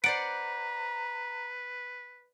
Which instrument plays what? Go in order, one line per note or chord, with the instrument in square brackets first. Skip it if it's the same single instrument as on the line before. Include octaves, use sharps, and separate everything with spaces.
[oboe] B4 [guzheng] C5 D5 F#5 [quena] A#5 [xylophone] D7